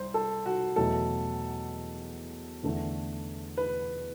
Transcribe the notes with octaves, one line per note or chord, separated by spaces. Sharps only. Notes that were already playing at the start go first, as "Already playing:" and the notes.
Already playing: C2 C5
A4
F#4
E2 B2 F#3 A3 A4
E2 D3 A3
B4